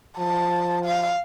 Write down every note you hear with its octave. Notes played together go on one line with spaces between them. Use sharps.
F3 A5
F5